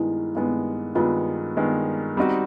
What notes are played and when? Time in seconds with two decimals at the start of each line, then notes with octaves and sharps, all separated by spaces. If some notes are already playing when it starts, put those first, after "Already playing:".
Already playing: G2 D#3 G#3 B3 E4
0.35 G2 D#3 G#3 B3
0.95 G2 D#3 G#3 B3 F4
1.57 G2 D#3 G#3 B3
2.17 G3 C4 D#4 F#4